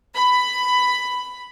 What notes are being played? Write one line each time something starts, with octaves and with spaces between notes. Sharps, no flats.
B5